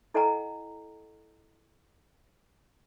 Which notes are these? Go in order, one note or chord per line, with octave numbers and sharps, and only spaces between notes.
E4 A4 D#5 F#5 G#5 A#5